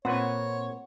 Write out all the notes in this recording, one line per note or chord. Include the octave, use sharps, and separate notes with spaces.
A#2 C4 B4 C#5 F#5